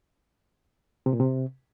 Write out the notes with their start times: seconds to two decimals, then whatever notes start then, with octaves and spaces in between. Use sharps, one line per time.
1.06 C3
1.13 A#2
1.20 C3